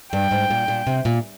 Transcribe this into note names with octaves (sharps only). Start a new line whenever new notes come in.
G2 G5
G#2
A#2
A#2
C3
A#2